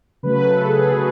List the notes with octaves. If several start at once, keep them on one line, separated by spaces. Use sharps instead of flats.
C#3 F#3 A3 B4
A4
G#4
C#3 F#3 A3 F#4